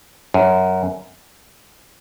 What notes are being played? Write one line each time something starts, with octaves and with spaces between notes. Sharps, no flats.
F#2